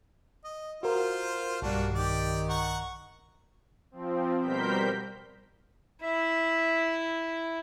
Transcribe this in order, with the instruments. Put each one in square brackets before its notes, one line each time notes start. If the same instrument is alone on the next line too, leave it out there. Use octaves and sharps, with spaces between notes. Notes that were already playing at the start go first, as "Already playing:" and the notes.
[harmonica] D#5
[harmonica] F4 C5 [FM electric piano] F#4 A#4
[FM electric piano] B1 G2 [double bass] G3 [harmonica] A#3 D4 F#4
[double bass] D#3 [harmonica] G4 D5
[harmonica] F#5 A#5 C#6
[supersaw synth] F3 C4
B2 G3 A#4 C5 G6 B6
[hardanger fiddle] E4 [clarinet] E5